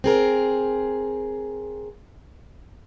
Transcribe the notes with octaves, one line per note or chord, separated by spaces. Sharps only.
C4 G#4 A#4